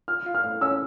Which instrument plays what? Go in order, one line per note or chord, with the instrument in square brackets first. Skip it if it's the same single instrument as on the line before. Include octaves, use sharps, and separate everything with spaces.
[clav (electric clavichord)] F4 [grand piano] F6
[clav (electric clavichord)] F4
[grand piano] F6
[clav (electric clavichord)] A2
[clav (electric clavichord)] C#4 [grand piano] E6